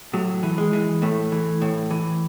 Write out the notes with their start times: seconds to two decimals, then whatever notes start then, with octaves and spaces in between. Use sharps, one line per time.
0.13 A2 F#3
0.43 E3
0.58 G#3
0.73 E3
1.02 A2 A3
1.32 E3
1.62 A2
1.91 E3